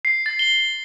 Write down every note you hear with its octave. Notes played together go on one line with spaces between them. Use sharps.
C7
A6
G7